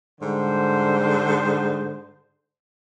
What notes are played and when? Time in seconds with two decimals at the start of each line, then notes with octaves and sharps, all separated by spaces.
0.21 G#2 D3 G3 C5